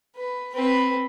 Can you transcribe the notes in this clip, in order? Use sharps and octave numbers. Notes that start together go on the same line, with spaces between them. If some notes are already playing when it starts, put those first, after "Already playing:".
B4
C4 B4